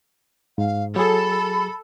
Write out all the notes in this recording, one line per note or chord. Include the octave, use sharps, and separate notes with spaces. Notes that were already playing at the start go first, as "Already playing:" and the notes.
G#2 F5
F#3 G#4 A4 B5